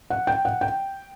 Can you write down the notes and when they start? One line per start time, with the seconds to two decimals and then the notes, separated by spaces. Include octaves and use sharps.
0.10 F#5
0.27 G5
0.45 F#5
0.61 G5